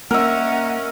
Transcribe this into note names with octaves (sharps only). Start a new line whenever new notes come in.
A#3 C#4 A#4 D#5 E5 F#5